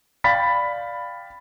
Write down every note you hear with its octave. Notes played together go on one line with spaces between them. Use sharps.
D5 F5 G5 B5 A6 B6